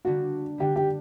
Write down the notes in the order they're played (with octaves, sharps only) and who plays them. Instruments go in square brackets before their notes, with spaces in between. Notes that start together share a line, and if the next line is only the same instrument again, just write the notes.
[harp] D3 G3 A#3 D4 [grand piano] F#4
[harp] D3 G3 A#3 D4 [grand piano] G4
[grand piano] G4